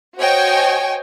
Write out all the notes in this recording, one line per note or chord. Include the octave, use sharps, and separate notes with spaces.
F#4 C5 C#5 D#5 G5 G#5